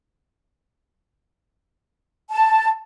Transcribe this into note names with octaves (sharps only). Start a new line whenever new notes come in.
A5